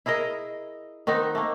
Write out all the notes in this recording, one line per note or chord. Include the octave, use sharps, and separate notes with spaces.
E4 G#4 A#4 D#5
D#3 B3 C4 D#4
A3 A#3